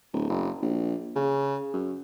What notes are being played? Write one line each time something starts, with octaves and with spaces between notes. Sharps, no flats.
D1
F#1
A#1
C#3
F#2